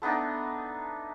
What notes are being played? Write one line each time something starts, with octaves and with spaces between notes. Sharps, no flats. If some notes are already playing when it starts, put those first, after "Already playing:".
A3 B3 D4 D#4